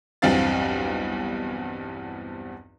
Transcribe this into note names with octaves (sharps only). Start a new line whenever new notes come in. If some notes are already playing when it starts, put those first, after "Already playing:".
B1 E2 G2 C4 F5 A6